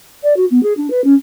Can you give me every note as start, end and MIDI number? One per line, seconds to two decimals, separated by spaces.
0.23 0.36 74
0.36 0.45 66
0.50 0.62 59
0.63 0.73 68
0.77 0.90 62
0.90 1.01 71
1.04 1.14 61